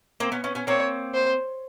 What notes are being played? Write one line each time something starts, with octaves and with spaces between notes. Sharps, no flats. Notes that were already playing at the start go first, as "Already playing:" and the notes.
A#3 C4
B3 C#4
B3 C#4
B3 C#4
A#3 C4 C#5
C5